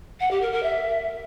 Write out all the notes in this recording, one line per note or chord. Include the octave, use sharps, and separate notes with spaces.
F#5
G4
A#4
A#4
E5